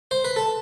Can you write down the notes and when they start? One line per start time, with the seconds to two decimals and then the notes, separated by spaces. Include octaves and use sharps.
0.11 C5
0.25 B4
0.36 A4